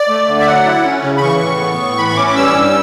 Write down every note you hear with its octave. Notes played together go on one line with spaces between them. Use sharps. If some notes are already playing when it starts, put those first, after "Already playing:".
Already playing: D5
A3
D3
E5
F#3 F#5
E4
C#4
C#3
B5
E3 C#6
A2
B3
A2
E3 B5
C#6
C#4 D6
D6
G3 E6
G2